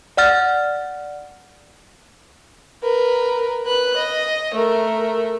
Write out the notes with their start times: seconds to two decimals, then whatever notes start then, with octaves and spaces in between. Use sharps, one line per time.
0.17 D5 F#5 F6 A6
2.83 A#4 B4
3.65 B4 F#6
3.96 D#5
4.54 A3 A#4